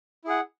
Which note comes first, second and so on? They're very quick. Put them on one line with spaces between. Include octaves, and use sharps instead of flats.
E4 G#4 F#5